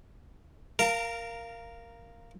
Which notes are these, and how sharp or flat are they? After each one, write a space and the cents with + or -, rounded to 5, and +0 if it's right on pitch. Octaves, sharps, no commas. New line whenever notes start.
A#4 +0 F5 -10 A#5 -45